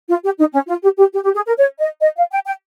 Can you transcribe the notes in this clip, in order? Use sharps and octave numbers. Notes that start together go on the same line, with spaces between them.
F4
G4
D#4
C#4
F4
G4
G4
G4
G4
G#4
A#4
C#5
D#5
D#5
F5
G5
G5